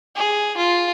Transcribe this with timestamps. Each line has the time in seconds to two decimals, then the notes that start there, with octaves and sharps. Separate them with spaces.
0.16 G#4
0.57 F4